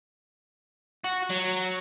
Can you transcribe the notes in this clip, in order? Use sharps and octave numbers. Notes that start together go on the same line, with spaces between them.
F#4
F#3